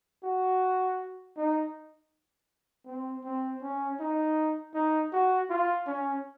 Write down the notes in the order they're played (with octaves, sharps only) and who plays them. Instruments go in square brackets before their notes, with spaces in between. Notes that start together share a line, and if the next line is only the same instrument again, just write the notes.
[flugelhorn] F#4
D#4
C4
C4
C#4
D#4
D#4
F#4
F4
C#4